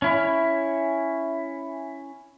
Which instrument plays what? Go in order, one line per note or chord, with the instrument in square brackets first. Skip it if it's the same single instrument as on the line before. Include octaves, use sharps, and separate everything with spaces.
[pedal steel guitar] C#4 E4